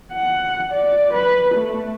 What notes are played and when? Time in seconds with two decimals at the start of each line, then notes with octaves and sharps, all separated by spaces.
0.13 F#5
0.72 D5
1.13 B4
1.54 A3